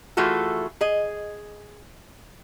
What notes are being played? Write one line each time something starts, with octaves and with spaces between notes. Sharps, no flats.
E3 A3 F4 F#4 G#4 A4
G#4 D#5